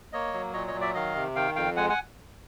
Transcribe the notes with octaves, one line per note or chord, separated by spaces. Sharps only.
A#3 C#5 D#5
F#3
A#2 C#5 D#5
C#5 D#5
F#3
D5 E5
D#3 D#5 F5
C3
D#3 F5 G5
F2 F5 G5
G#3 F#5 G#5
F#5 G#5